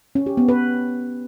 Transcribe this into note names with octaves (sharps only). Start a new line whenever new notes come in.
C#4
G4
B3
B4